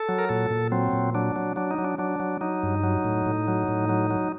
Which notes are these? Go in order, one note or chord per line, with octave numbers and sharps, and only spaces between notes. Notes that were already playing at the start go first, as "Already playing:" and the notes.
Already playing: A4
F#3
A#4
A#2 A4
A#2
F#3 C4
A#2
F#3 D4
F#3
F#3 D4
D#4
F#3
D4
F#3 D4
F#3
F#3 D#4
G2
F#3
A2
A2
F#3
A2
F#3
F#3